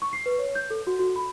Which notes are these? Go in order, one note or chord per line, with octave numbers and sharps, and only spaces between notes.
C#6
C7
B4
C#5
G6
A4
F#4
F#4
B5